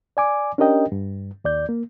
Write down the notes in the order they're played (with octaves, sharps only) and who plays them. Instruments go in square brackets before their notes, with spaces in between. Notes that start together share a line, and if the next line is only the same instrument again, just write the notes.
[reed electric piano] D5 G#5 D6
C#4 D4 G4 A#4 D#5 G5
G2
D#2 D5 G6
A#3